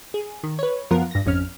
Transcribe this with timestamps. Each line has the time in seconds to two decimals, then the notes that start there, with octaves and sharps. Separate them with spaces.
0.14 G#4
0.44 D#3
0.59 B4 C#5
0.91 F#2 F3 B3 F4 A#4 F#5
1.11 G2 A#6
1.26 G#1 F2 C#4 F6